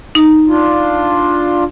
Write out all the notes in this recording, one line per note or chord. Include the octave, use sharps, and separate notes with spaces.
D#4
D4 F4